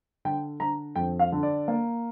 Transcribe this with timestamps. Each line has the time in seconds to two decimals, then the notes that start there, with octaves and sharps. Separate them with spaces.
0.25 D3 G5
0.60 D3 A#5
0.96 F2 G5
1.19 F5
1.32 D3
1.43 D5
1.68 A#3